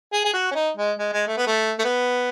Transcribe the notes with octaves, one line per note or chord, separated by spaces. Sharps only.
G#4
G#4
F#4
C#4
D#4
G#3
G#3
G#3
A3
B3
A3
A3
B3